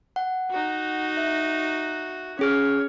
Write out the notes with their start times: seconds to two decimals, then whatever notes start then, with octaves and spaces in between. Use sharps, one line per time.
0.16 F#5
0.50 D#4 F#4
1.17 E5
2.39 C#4 G#4 C#5 F6